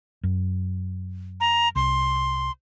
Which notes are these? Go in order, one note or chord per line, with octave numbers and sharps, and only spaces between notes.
F#2
A#5
C2 C6